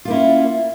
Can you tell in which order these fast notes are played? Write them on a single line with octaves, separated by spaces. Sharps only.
F4 A#3 E4 C#4